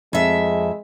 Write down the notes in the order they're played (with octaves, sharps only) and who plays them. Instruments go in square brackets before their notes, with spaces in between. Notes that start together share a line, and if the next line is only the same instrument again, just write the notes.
[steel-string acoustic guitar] F2 E5 [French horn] G#3